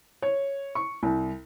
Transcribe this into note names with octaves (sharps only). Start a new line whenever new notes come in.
C#5
C#6
C2